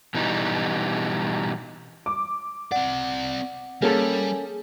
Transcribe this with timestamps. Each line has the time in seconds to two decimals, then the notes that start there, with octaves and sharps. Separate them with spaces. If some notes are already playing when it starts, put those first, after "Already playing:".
0.14 B2 E3 G3 D#4
2.06 D6
2.72 C4 D5 F#5
3.82 G3 A#3 C#4 G#4 A4